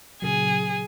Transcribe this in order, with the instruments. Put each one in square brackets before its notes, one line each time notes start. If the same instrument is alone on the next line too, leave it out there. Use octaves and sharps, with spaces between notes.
[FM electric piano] A#2 C#3 F#3 [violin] G#4